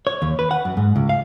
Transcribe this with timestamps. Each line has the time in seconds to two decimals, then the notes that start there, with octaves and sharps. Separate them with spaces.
0.07 C#5
0.22 D#2
0.39 B4
0.51 F#5
0.65 F#2
0.77 G#2
0.96 C#2
1.09 F5